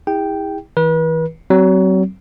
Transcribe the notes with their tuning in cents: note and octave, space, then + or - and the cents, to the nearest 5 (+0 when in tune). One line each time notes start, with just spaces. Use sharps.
E4 -30 G#4 -45 G5 -5
E3 -35 B4 -40
F#3 +30 C4 +0